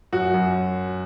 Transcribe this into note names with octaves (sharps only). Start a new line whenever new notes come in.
F#2 F#4
F#2